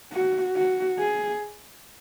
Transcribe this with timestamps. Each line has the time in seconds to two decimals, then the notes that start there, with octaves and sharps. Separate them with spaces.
0.12 F#4
0.55 F#4
0.99 G#4